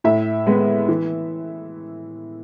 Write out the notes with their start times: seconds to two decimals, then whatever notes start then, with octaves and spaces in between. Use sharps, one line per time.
0.04 A2 E5
0.47 G#3 B3
0.89 E3